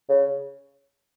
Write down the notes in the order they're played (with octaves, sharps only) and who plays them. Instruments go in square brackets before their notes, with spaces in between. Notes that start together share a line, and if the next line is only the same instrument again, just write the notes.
[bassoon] C#3